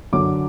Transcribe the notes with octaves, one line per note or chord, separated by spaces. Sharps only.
F#2 D3 F#3 D6